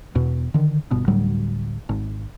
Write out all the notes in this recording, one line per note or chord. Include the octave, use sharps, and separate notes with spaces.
E2 B2
D3 D#3
G1 B2
D2 A2 F#3 G3
G#1